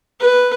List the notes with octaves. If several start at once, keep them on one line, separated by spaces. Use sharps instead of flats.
B4